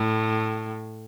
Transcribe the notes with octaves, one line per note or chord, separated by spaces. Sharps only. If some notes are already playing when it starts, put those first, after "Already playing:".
Already playing: A2